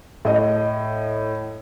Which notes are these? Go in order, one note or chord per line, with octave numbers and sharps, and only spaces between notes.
A2 D#5